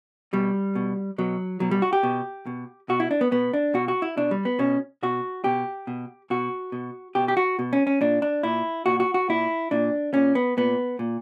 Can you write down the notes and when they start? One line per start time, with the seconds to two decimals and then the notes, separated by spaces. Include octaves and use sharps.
0.33 B2 G3
0.75 B2
1.18 B2 F#3
1.60 B2 F#3
1.71 G3
1.82 F#4
1.93 G4
2.03 B2
2.46 B2
2.89 B2 F#4
3.00 E4
3.11 D4
3.21 B3
3.32 B2 B3
3.53 D4
3.74 B2 F#4
3.88 F#4
4.02 E4
4.17 B2 D4
4.31 G3
4.45 B3
4.59 B2 C#4
5.03 B2 F#4
5.44 B2 G4
5.87 B2
6.30 B2 F#4
6.72 B2
7.15 B2 G4
7.28 G4
7.37 F#4
7.59 B2
7.73 C#4
7.87 C#4
8.01 A#2 D4
8.22 D4
8.43 A#2 E4
8.86 A#2 F#4
9.00 F#4
9.14 F#4
9.29 A#2 E4
9.71 A#2 D4
10.14 A#2 C#4
10.35 B3
10.57 A#2 B3
10.99 A#2